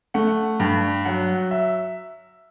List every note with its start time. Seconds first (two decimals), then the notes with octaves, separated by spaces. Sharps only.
0.14 A3 F#5
0.60 G2 G5
1.05 F#3 F#5
1.51 E5